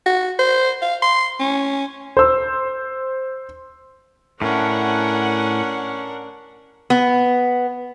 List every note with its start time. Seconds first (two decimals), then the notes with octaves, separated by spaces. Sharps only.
0.06 F#4
0.39 C5
0.82 F5
1.02 C6
1.40 C#4
2.17 C5 E6
4.42 A2 C#4 D4 A#4 F#5
6.90 B3